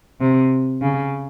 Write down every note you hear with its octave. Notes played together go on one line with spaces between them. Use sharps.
C3
C#3